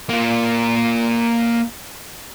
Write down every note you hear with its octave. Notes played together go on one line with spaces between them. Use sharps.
A#3 F4